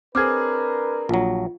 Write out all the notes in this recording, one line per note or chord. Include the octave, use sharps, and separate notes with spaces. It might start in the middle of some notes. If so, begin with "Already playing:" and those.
C4 D4 G#4 A#4 B4 D6 F6 G#6
A#1 F#3 F4